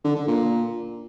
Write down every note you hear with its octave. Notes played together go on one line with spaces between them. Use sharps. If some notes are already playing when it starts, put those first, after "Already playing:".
D3
D3
A#2